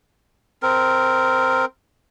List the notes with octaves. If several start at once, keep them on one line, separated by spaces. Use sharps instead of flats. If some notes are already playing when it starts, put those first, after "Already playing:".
C4 A#4